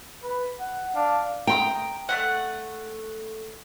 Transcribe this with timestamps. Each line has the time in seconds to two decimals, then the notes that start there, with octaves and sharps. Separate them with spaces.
0.23 B4
0.59 F#5
0.95 D4 F5
1.47 G5 A#5 C6 D#6
2.09 A3 C#4 F#5